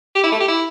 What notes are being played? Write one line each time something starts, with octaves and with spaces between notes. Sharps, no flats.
G4
E4
A3
G4
E4